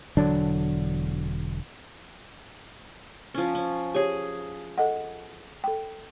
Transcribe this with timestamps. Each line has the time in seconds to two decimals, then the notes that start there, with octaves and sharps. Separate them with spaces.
0.17 E1 D3 F#3 D4
3.34 F3 C#4
3.55 C#4
3.94 G4 G#4 C#5 G#5
4.78 A4 D#5 F#5
5.64 A4 G5